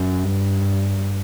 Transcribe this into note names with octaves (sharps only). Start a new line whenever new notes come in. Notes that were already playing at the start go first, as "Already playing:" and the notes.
Already playing: F#2
G2